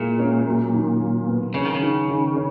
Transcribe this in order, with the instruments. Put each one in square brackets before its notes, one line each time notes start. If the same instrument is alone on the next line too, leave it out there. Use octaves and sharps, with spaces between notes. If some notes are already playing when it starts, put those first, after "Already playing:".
Already playing: [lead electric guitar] A#2 [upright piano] G#3 E4
[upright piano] C#4
F#3
D#3
F#3
B3
[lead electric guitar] C#3 [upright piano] C#4
[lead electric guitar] D#3
C#3
[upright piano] D#3
D#3
C#4